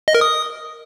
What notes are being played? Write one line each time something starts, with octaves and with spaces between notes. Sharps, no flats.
D#5
A#4
D#6